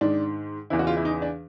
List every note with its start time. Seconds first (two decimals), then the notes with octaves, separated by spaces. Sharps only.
0.01 G#2 D#3 D4
0.70 E2 C#3 E3 E4
0.79 F#4
0.87 F4
0.97 E4
1.05 D#4
1.22 D4